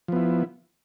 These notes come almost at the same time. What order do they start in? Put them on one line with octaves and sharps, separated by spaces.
F3 B3 E4